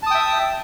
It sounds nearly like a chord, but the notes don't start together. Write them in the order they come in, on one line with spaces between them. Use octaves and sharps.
A5 D#6 G5 E5